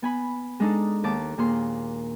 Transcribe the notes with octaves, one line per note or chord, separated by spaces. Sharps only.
B3 G#5 B5
G#3 D4 D#4 A4
D#2 A5 D6
D#2 A#2 G#4 C6